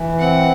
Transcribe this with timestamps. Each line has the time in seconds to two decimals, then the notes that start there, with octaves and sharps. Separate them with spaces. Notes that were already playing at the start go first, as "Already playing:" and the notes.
Already playing: E3
0.19 C4 F#5